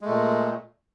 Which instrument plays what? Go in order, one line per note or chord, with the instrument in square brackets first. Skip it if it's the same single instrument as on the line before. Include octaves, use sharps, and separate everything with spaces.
[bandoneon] G#3
A3
A#2